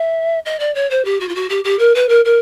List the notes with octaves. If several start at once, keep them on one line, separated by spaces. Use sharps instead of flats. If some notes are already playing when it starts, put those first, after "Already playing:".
Already playing: E5
D#5
D5
C#5
C5
G4
F#4
F4
F#4
G4
G4
A#4
B4
A#4
A#4